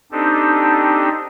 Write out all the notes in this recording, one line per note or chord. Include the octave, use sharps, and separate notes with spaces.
C4 D4 D#4 G4 A4